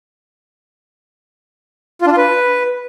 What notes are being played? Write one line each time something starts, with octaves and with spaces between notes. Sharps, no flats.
F4
D4
F4
B4